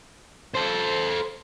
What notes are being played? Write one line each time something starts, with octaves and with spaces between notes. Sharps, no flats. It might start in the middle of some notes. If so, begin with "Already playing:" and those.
A4 C5